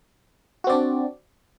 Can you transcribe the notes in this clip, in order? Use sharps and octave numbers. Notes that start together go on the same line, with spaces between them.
C4 D4 F#4 D5